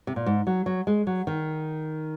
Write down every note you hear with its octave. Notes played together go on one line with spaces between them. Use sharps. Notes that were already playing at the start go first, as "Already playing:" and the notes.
C3
A#2
G#2
F#3
F#3
G#3
F#3
D#3